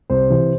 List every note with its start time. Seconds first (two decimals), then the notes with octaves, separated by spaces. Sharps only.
0.10 C2 C5
0.30 C3 E3